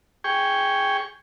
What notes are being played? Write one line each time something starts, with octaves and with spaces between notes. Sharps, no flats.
G#4 G5 C#6